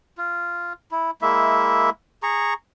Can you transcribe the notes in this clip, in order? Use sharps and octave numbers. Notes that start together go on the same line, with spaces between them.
F4
E4
G#3 A#3 E4 E5
G#4 A#5 C#6